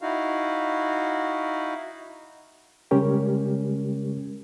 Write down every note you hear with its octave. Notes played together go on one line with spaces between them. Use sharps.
D#4 E4 F#4 F5
C#3 G3 G#3 C#4 G4 A#4